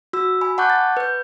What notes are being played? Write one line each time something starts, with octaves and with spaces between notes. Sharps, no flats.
F#4 E6
G#5 B5
F#5 A5 C#6 D6 F#6 G6
A6
B4 G6